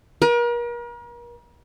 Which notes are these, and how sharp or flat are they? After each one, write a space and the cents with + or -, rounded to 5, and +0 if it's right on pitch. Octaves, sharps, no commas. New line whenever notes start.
A#4 +40